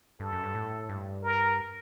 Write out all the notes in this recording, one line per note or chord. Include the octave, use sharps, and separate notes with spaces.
G2 A4
F#2
G2
A2
G2
A#4